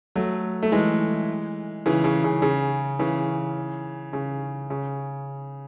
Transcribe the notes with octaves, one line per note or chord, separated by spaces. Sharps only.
F#3 A3
A3
E3 G#3
C#3 E3
C#3
C#3
C#3
C#3 E3
C#3
C#3